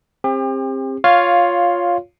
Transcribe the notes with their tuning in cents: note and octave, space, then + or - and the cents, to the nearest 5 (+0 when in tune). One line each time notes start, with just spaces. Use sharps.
C4 +25 G4 +40
F4 +10 C#5 +10 F5 +0